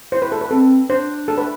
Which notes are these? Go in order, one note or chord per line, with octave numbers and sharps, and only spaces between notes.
E4 C5
B4
A4
B4
C4 A4
D4 C5
A4
B4